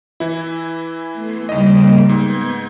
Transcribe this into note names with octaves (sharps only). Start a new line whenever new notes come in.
E3 E4
A3 B3 C6
D#2 C#3 G3 A#3 D#5
G#2 B3 G6 G#6